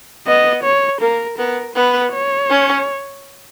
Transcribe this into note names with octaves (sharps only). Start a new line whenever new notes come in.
B3 D#5
C#5
A#3 A#4
B3 A#4
B3 B4
C#5
C#4